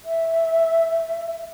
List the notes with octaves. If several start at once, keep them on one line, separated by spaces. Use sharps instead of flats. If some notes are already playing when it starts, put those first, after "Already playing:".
E5